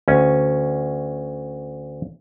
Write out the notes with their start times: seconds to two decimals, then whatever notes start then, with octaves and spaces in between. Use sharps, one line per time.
0.08 D2 C#4